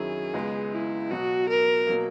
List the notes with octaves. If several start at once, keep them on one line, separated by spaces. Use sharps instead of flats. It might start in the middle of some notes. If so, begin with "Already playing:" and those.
Already playing: F#2 D#3 F#3 C#4 E4 G#4
C#2 C#3 G#3 B3
E4
B2 F#3 B3 F#4
A#4
B2 F#3 A#3